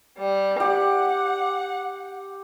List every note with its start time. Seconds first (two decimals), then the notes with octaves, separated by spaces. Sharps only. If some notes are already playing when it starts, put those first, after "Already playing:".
0.17 G3
0.60 G4 F#5